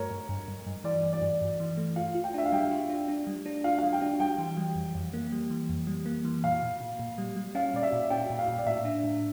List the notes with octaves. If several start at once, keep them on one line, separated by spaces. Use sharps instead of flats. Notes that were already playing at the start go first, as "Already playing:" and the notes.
Already playing: G2 A3 A#4 C#5
G2
G2
G2
G2
E3 D5
G2
D5
G2
G2
E3
A3
F4 F5
F4
G5
D4 E5
F5
G3 G5
F4
D4
D4
G3
D4
F4 F5
G3 F5
G5
D4
G3 G5
E3
G3
F2
F2
A#3
G3
E3
F2
G3
A#3
E3
A#2 F5
A#2
A#2
A#2
G3
G3
C#4 F5
A#2 D5
E5
A#2
C#4 G5
A#2
F5
A#2
D5
A2 E5
D4
A2